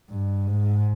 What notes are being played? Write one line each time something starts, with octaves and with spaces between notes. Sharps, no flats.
G2
G#2